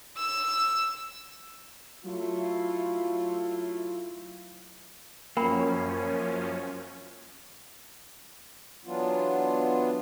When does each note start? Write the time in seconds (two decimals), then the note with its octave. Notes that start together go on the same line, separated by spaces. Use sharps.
0.17 E6
2.05 F#3 A3 E4 F4
5.37 F#2 F3 A#3 C#4 A#4 G5 B5
8.85 E3 F#3 B3 D4 F4